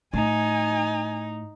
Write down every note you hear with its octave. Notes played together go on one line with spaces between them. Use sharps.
A2 D#4 G#5